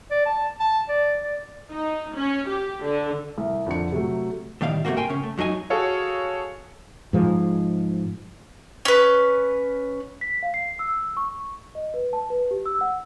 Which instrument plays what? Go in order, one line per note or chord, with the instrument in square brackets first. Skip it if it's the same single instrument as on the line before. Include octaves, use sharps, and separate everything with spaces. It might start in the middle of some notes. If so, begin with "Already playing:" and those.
[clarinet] D5
A5
A5
D5
D5
[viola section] D#4
C#4
G4
D3
[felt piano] C2
F2 D3 C#7
C3 F#3 A3
[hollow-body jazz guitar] A2 C3 D#3 G3 F5
G#2 C3 A3 A#3 F#4
A#4 G5 G#5 C6
C#3 C#4
A3
F#2 F#3 D#4 G#4 G#5
[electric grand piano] F#4 G#4 A4 C#5 F5
[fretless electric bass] G#2 F3 G#3
[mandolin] C#4 B4
[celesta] B6
F5
C7
E6
C#6
D#5
B4
A5
B4
G4
E6
F#5